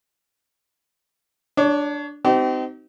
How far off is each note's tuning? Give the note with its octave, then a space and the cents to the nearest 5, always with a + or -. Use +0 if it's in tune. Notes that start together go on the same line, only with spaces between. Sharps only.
D4 +0 C#5 +30
C4 -30 D#4 +0 G4 -40